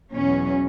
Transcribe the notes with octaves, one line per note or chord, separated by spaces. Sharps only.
E2 B2 F#3 C#4